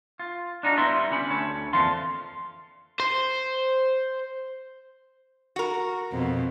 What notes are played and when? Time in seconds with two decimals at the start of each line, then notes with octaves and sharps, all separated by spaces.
0.20 F4
0.63 D4 D#4 F4 F#4
0.77 G3 B3 E4 C#5 C6
1.11 D3 G3 C#4 B5
1.30 D2 A4 C#5
1.73 F2 A#2 E3 A4 F5 C6
3.00 C5
5.56 F#4 A#4
6.12 F2 B2